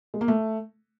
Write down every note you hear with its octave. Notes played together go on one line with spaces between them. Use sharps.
G#3
A#3
A3